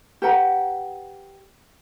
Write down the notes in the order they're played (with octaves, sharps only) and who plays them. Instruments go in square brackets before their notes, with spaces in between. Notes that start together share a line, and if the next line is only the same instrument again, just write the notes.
[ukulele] G4 B4 F#5 A#5